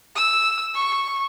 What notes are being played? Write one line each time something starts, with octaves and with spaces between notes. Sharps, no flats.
E6
C#6